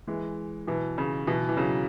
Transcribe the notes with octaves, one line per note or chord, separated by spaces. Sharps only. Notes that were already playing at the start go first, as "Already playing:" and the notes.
E3 G#3
B2 E3
C#3
B2 E3
E3
C#3 F#3